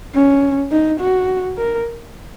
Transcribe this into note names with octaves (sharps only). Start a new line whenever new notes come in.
C#4
D#4
F#4
A#4